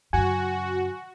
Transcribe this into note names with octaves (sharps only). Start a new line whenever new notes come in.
F#2 C#3 F#4 G#5